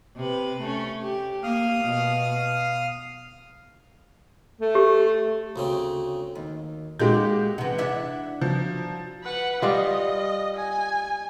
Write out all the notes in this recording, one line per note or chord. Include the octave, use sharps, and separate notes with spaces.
C3 B4
A3 C#4
G4
A#3 F5 D#6 F6
B2
A3
G4
D2 C#3 C4
D#2
A#2 G#3 D#4 F#4 G4 G6
C3 E3 F#5
D4 E4 E5
F3 F#3
B4 F#5
G3 F4 D#5
G#5